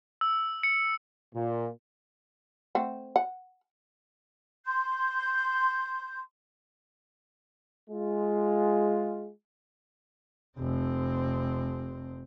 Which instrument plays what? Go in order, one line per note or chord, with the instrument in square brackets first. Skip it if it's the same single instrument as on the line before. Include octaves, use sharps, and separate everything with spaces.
[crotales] E6
C#7
[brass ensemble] A#2
[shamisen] A3 C4 F#5
F#5
[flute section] C6 G6
[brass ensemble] G#3 F4
[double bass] F1 C4